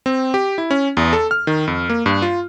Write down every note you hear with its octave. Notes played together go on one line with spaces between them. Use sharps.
C4
G4
E4
C#4
E2
A4
F6
D#3
F2
A#3
G2
F4